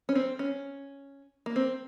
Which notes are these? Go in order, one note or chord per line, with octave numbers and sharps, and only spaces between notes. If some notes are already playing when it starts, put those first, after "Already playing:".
C#4
C4
C#4
A#3
C4